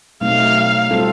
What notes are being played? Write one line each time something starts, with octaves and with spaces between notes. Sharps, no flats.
B2 F#3 A3 C4 D#4 F5
G3 C4 F4 A4